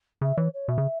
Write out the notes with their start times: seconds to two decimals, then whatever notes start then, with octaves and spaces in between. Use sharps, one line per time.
0.21 C#3 E5
0.37 E3 C#5
0.53 C#5
0.68 B2 E5
0.78 C#3